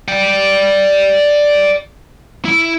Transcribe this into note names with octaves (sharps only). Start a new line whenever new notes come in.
D5 G5
E4